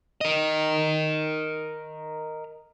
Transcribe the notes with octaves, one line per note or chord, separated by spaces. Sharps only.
A#4 D#5